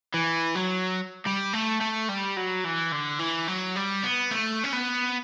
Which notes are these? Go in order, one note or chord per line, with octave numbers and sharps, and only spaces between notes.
E3
F#3
G3
A3
A3
G3
F#3
E3
D3
E3
F#3
G3
B3
A3
C#4
B3